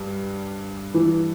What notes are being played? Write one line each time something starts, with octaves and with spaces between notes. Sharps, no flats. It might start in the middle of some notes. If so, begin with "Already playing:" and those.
Already playing: G2 G3
E3